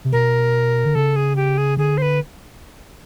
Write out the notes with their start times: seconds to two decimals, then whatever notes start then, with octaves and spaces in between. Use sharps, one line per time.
0.05 C3
0.12 B2 A#4
0.85 D3
0.95 C#3 A4
1.16 G#4
1.36 G4
1.58 G#4
1.77 D3 G#4
1.98 C5
2.02 B4